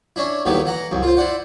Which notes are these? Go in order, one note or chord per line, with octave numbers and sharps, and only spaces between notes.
C#4 D4 E4
D#2 A2 D#3 F#3 G3 B3
E3 F#5 A#5
C2 F#2
F4 C5
E4 C5 D5 F#5